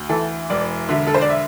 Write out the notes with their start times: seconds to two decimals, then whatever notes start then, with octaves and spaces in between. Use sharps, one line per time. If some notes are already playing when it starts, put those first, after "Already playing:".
Already playing: D2
0.09 E3 A4
0.50 E1 D5
0.89 D3 E5
1.07 A4
1.14 C5
1.21 D5
1.30 E5